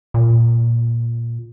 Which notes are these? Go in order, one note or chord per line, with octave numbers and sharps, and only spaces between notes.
A#2